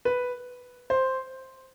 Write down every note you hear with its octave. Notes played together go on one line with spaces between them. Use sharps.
B4
C5